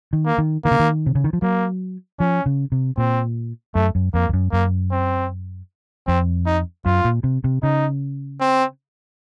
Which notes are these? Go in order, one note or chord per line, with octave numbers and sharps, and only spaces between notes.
D#3
A#3
D#3
D#3 A#3
C#3
D#3
C3
C#3
D#3
F3
F#3 A#3
F3 C#4
C#3
C3
A#2 C4
F#2 A3
F#2
F2 A#3
F2
F#2
F#2 A#3
C4
F2 C4
D#4
F#2 F4
A#2
C3
C3
C#3 D#4
C4